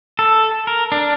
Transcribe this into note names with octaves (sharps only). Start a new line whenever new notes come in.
A4
A#4
D4